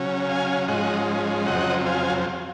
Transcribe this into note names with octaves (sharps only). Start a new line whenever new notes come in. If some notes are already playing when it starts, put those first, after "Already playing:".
Already playing: C#3 F#3 C#4
F5 G#5
G#2 F3 G#3 C#4 D#5 F#5
F2 C#3 F#3 C4 D#5 F#5
F5 G#5